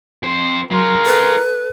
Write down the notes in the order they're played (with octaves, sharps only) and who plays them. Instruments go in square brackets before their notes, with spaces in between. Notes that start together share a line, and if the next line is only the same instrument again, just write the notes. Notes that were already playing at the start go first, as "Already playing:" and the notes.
[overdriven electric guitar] F2 C5
[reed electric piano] F#3 C6 [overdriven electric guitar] G#3 F4 [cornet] A#4
[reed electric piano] A4 [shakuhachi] B4